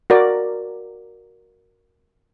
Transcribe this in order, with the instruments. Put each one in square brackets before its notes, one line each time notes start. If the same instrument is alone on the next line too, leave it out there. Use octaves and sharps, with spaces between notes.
[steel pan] F#4 A#4 D5